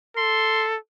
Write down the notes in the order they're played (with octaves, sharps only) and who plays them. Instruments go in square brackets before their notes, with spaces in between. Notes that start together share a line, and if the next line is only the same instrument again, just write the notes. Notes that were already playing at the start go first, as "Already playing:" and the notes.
[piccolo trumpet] A4 [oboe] C6